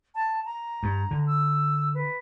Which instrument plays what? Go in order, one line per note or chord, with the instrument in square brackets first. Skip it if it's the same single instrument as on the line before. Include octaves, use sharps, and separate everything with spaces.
[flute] A5
A#5
[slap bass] G2
D3
[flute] E6
B4